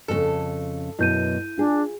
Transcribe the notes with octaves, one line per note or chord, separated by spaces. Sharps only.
F2 A#2 C#3 A4
F#2 B2 B3 E4 G6 D#7
D4 F4 G#4